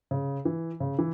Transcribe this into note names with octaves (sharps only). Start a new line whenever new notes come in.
C#3
E3
C#3
E3